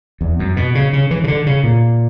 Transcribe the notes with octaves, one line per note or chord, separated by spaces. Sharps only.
E2
F#2
B2
C#3
C#3
E3
C#3
D3
C#3
A#2